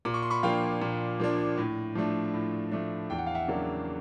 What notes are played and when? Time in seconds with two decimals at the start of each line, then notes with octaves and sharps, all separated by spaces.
0.05 A#2 D6
0.14 C#6
0.22 C6
0.30 B5 C#6
0.43 F3 A#3 D4 F5 G5
0.82 A#2
1.20 F3 A#3 D4
1.57 A2
1.95 F3 A3 D4
2.34 A2
2.72 F3 A3 D4
3.10 E2 G5
3.18 F#5
3.27 F5
3.35 E5 F#5
3.48 C#3 F#3 A#3 D4